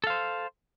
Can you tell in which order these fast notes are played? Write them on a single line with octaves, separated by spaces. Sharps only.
A4 F5 C5